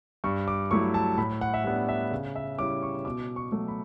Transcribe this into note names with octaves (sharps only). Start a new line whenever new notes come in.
G2 C#6
D6
F#3 A3 E4 C#6
A5
A2 B5
F#5
E5
G3 B3 D4 F#5
E5
C#3
E5
G3 C#4 E4 D6
C#6
B2 D6
C#6
F#3 A3
B5